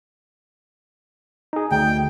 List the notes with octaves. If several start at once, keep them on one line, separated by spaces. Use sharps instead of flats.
D#4 G#4
D2 G5